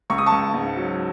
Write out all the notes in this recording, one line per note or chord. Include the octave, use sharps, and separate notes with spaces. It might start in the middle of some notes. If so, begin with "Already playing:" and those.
C#2 C#6
D#6
A5 C#6
C#2
G#2
F#3